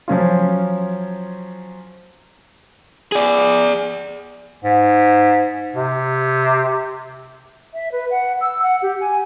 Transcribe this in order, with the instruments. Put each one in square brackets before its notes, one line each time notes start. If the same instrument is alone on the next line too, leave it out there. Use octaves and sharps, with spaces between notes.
[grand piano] F3 F#3 C#4 F4
[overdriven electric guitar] G#4 D5
[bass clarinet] G#2
C3
[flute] E5
B4
F#5
E6
F#5
G4
G#5